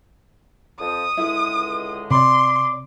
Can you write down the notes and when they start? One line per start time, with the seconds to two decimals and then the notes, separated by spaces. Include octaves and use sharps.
0.80 F2 F3 D#6
1.17 C#2 D3 G#3 E4
2.11 C3 D5 B5 C6 D6